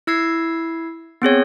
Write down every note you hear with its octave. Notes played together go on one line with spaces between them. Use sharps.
E4 E6 G#6 C7
B3 C4 G#4 C#5